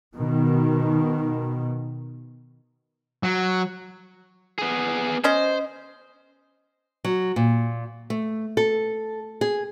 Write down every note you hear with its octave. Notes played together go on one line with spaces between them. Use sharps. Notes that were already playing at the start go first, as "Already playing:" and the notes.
B2 D#3
F#3
B3 G#4
C#4 C5 D#5
F#3
A#2
A3
A4
G#4